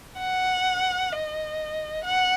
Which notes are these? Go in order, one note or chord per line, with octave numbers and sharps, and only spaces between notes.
F#5
D#5
F#5